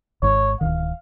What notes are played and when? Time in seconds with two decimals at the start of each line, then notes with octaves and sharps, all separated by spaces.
0.22 G#1 G#2 C#5
0.61 D1 C2 D#3 F5